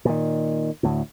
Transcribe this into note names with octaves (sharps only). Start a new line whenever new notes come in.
A#2 D#3
D2 A2